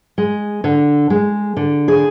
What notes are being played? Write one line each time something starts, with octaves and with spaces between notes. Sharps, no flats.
G#3
D3
G#3
D3
G#4